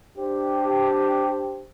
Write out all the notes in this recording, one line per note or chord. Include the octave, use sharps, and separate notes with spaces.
D4 G4 C5